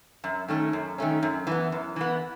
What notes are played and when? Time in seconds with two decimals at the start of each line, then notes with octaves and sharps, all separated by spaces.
0.24 F#2
0.48 D#3 A3 C#4
0.73 F#2
0.98 D#3 A3 C#4
1.23 F#2
1.47 E3 B3
1.72 F#2
1.96 E3 B3